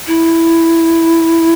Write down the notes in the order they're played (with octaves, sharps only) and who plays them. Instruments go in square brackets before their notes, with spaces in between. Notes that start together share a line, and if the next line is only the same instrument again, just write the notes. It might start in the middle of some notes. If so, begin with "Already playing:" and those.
[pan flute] E4